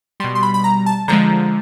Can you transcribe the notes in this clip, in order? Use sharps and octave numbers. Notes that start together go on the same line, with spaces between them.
B2 G3 C6
C6
B5
B5
A#5
A5
D3 F3 G#3 A#5